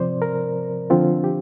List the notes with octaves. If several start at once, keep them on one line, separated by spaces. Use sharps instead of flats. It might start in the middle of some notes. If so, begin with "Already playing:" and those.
Already playing: C3 F3 C4 C5 D5
A#4
D3 F3 C4 F4
G4